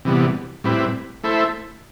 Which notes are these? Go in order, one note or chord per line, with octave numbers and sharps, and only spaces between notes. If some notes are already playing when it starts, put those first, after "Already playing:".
C3 E3 G3 B3
A2 G3 C4 E4 B4
A3 E4 A4 C5 E5